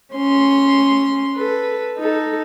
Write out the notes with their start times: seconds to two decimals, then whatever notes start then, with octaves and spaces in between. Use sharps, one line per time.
0.14 C#4 C6
1.36 A4 B4
1.98 D#4 A4